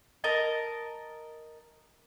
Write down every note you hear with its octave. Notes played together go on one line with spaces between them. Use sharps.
A#4 D#5 A5